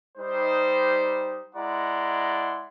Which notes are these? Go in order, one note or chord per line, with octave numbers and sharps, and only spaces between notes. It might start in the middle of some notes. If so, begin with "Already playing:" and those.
G3 D#4 C5
G#3 E4 D5 F#5 A#5 C6